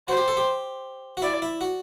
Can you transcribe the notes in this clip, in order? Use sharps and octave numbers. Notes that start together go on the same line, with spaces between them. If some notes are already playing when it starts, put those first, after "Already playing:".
F#4 C5
G4
A4
G4
F#4
E4 D5
E4
F#4